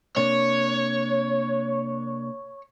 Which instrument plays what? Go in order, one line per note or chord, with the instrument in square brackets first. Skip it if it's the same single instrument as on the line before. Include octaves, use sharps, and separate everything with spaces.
[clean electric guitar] C3 A#3 D4 [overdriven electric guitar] C#5